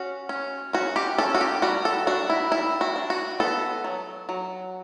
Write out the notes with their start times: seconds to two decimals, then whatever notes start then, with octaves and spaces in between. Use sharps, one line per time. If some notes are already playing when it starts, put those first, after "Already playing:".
Already playing: C#4 F#4
0.29 C#4
0.73 C#4 F#4
0.96 G4
1.18 C#4 A4
1.35 F#4
1.41 G4
1.62 G3 F#4
1.85 A4
2.07 D4 F#4
2.30 E4
2.52 G3 E4
2.81 F#4
2.96 D4
3.10 F#4
3.40 B3 A4
3.84 F#3
4.29 F#3